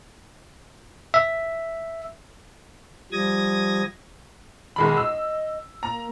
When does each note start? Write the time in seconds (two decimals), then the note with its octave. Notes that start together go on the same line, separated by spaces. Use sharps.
1.14 E5
3.12 F3 G3 D#6 G#6 A#6
4.76 B1 D#3 G#3 B5
4.97 D#5 E6
5.83 A#3 A#5